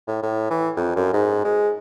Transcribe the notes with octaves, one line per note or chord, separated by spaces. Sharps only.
A2
A2
E3
F2
F#2
G#2
G#3